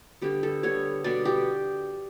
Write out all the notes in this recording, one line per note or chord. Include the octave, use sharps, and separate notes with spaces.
D3 G3 B3 G4
A4
D3 G3 B3 C#5
B2 G3 B3 D5
G4